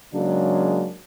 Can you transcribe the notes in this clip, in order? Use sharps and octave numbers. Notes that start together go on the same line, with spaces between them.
C#3 F#3 G#3 A#3 D4